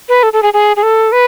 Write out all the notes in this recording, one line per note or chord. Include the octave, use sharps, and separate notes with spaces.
B4
A4
A4
G#4
G#4
G#4
A4
B4